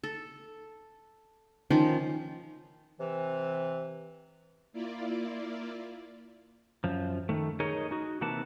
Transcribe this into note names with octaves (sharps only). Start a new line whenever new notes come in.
A4
D#3 F3 C#4
C3 E3
A#3 E4 F4 D5
F#2 F3
D#3 A3
D#4 G#4 A#4 C#5 D#5
D#4 F#4
C3 E3 A#3 F#5 A5